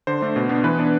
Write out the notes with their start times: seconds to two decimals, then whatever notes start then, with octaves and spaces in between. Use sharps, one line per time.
0.07 D3 C5
0.22 A3 D4
0.36 B2
0.49 B3 D4
0.64 E3 B4
0.79 B3 D4